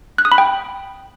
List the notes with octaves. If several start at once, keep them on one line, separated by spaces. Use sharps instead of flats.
F#6
D#6
B5
G5